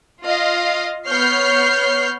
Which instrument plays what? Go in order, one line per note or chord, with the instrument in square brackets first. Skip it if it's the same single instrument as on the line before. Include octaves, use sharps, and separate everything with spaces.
[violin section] F4 D#5 F5
B3 C#5 F6 G6 C7